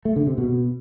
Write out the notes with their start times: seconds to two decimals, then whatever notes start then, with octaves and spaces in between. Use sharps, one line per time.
0.05 A3
0.16 D3
0.27 C3
0.38 B2